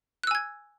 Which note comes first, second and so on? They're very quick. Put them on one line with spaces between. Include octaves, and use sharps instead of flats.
F#6 E6 G#5 G#6